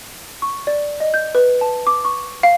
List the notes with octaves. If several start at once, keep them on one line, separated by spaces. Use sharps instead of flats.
C#6
D5
D#5
G6
B4
A5
D6
C#6
F5